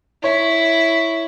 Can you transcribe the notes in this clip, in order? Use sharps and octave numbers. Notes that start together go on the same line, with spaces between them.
E4 C#5